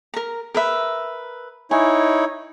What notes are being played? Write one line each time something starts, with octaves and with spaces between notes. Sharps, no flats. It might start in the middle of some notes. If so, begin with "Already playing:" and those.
A#4 A#5
A#4 B4 E5
D#4 E4 C#5 G#5